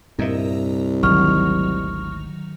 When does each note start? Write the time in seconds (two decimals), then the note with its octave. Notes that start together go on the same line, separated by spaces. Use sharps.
0.19 C2 G2 A#2 A#4 D#5 E5
1.03 G#1 D2 D#3 F#3 C#6 F6 F7